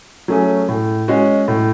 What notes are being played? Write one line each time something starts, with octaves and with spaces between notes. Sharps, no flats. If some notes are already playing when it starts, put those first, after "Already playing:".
F#3 A3 C#4 G#4
A2
G#3 C#4 F#4
A2